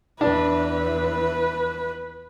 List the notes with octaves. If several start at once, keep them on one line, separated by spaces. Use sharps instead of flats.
E2 E3 D4 B4